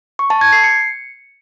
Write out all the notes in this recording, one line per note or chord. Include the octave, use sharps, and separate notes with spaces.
C#6
A5
G#6
C7
C#7